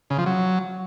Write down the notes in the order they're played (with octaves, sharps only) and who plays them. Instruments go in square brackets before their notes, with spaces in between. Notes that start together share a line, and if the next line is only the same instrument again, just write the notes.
[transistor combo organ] C#3
F3
F#3